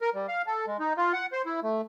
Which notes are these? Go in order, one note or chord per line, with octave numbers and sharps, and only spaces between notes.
A#4
G3
F5
A4
G#3
D#4
F4
F#5
C5
E4
A3